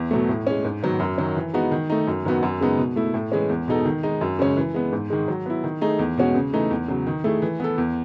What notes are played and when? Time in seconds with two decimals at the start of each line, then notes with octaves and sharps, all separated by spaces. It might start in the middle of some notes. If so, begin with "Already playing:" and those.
Already playing: E2
0.11 B2 F#3 A3
0.29 A2
0.47 G#3 C#4
0.65 G#2
0.83 D#3 F#3 B3
1.00 F#2
1.18 D#3 F#3 C#4
1.36 E3
1.54 G#3 B3 D#4 F#4
1.71 D#3
1.90 A3 D#4
2.07 F#2
2.25 D#3 F#3 B3 F#4
2.43 F#2
2.61 C#3 G#3 B3 D#4
2.78 B2
2.96 A3 E4
3.14 A2
3.32 E3 G#3 C#4
3.50 E2
3.68 B2 G#3 D#4 A4
3.85 D#3
4.03 G#3 D#4
4.21 F#2
4.39 C#3 G#3 C#4
4.57 E3
4.74 G#3 B3
4.92 G#2
5.10 D#3 G#3
5.28 F#3
5.46 B3 E4
5.64 D#3
5.81 A3 D#4 G#4
5.99 E2
6.17 B2 G#3 C#4 F#4
6.35 C#3
6.53 E3 A3 D#4
6.71 E2
6.88 C#3 F#3
7.07 D#3
7.24 A3 E4 G#4
7.42 E3
7.60 B3 E4 A4
7.78 E2